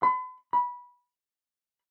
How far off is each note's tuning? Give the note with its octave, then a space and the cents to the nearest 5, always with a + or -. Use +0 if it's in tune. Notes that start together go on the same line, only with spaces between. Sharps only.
B5 +40
B5 -15